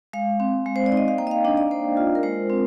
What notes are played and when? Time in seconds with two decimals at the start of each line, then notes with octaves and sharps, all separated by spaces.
0.13 G#3 F5
0.40 C4
0.66 G#3
0.76 C5
0.86 D5
0.92 D#4
0.97 D#5
1.08 F5
1.18 A#3 G5
1.27 D#5
1.31 F5
1.45 D4 D#5
1.57 D5
1.71 A#3 C5
1.97 F4
2.15 A#4
2.23 G#3 C5
2.50 C4